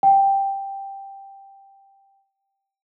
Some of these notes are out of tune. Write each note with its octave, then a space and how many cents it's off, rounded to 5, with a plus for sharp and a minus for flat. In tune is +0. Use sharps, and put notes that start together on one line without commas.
G5 +5